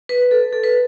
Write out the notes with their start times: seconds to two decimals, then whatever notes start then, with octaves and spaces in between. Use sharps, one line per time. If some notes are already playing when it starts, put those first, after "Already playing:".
0.09 B4
0.31 A4
0.53 A4
0.63 B4